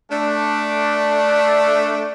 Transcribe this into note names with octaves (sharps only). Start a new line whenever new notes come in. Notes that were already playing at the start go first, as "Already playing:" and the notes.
A3 D4